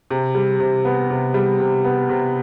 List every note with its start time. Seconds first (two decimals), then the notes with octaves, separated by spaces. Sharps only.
0.11 C3
0.35 G3
0.60 C3
0.85 B3
1.10 C3
1.34 G3
1.60 C3
1.84 B3
2.09 C3